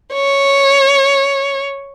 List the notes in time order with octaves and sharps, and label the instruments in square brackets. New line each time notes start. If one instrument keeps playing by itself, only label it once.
[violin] C#5